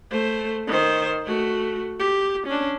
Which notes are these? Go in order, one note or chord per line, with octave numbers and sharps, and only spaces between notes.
A3 C5
D#3 C5
A3 F#4
G4
C#4 D4